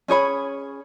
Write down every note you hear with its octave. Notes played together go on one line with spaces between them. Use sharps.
C#4 G#4 C#5 B5